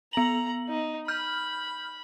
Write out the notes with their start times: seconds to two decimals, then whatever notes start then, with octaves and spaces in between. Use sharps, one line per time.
0.13 B3 A#5 F#7
0.68 D#4
1.08 B5 F6 G6